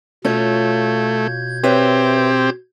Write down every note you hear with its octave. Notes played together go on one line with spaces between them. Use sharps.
B2 A3 C#4 F4 C#5 G6 G#6
C4 G4 B4 C#5 E5